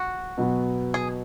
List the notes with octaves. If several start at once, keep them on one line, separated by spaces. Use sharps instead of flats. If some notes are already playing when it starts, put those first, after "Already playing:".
Already playing: F#4
B2 F#3 B3
G#4